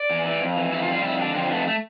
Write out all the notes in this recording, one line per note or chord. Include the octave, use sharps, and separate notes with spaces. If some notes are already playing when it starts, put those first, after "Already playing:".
Already playing: D5
E2
E3
F2
E3
F2 E4
F4
G3
F4
F2 E4
D3 D4
F2 C4
A3 B3
A3